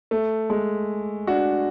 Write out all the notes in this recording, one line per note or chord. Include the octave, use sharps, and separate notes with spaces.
A3
G#3
D4 F#4